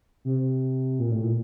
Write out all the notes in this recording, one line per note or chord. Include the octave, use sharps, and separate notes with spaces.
C3
A#2
A2
A#2